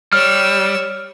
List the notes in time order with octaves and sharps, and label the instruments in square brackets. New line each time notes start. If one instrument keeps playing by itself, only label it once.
[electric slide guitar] G3 [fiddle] C#5 E6 [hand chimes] F6